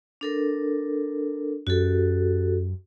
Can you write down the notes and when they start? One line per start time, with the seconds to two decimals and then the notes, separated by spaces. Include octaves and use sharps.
0.21 D4 A4 A#4
1.67 F#2 F#4 G4 A4